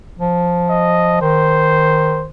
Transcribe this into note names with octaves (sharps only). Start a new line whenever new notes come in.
F3
D#5
D#3 C5